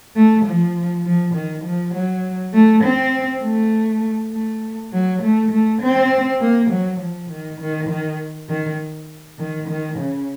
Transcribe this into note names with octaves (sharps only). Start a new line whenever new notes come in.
A3
F3
F3
D#3
F3
F#3
A3
C4
A3
A3
F#3
A3
A3
C4
A#3
F#3
F3
D#3
D#3
D#3
D#3
D#3
D#3
C#3